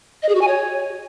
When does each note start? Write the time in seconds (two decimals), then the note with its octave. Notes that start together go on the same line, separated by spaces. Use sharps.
0.22 D#5
0.29 G#4
0.35 F#4
0.41 G#5
0.47 C#5